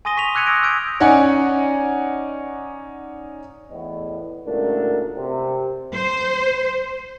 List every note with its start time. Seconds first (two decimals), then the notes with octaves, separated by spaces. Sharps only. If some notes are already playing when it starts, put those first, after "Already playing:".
0.05 G#5 C6 D#6 A#6 D#7 G7
0.17 C#6 B6 D#7 F7
0.34 D6 E6 F#6 G#6 C#7 D#7
0.46 D#6 E6 F#6 G#6 A#6 D7
0.62 C#6 E6 F6 G6 G#6 D7
1.00 C#4 D#4 D5 F#5 G#5
3.71 E2 A2 B3 D#5
4.47 C#2 A2 A3 D4 F#4 A#4
5.16 C3
5.95 C5